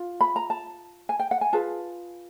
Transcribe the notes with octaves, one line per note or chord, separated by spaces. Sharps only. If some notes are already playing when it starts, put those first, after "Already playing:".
Already playing: F4
B5
A#5
A5
G#5
G5
F#5
G#5
F4 G#4 B4 A5